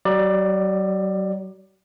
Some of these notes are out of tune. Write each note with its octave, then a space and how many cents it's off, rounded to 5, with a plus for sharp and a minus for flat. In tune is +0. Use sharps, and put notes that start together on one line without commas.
F#3 +40 D5 +20